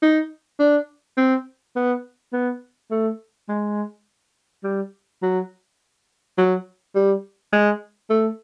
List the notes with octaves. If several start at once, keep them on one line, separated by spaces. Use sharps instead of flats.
D#4
D4
C4
B3
B3
A3
G#3
G3
F#3
F#3
G3
G#3
A3